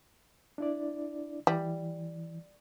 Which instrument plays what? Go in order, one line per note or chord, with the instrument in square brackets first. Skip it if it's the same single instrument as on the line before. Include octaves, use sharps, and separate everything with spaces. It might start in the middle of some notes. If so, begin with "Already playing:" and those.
[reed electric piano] D4 E4 D5
[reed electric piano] E3 [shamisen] G3